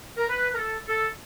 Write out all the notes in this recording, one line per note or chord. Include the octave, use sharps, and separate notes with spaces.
A#4
B4
A#4
A4
A4